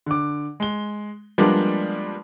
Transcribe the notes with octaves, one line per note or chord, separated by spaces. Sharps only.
D3 D6
G#3 G7
F3 G3 G#3 A#3 B3 D4